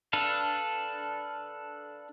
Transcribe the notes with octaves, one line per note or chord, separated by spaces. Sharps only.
D4 A4 B4 F5